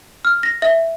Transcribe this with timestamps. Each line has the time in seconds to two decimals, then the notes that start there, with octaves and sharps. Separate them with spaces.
0.25 F6
0.43 A#6
0.62 E5